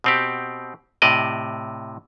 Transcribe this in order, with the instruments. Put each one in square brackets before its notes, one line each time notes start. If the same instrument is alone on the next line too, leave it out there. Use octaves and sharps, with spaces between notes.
[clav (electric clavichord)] B2 C4 G4
A2 C3 D5 D#5